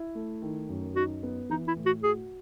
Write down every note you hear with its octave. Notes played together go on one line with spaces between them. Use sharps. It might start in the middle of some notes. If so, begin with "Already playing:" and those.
Already playing: E4
A3
D#3
F#2
D#4 F#4
B3
E3 D#4
E4
A2
F#4
F#4 G#4